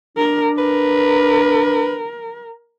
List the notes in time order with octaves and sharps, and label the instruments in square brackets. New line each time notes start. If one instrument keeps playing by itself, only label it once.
[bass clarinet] D4 [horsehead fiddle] A#4
[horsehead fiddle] A#4 [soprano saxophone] B4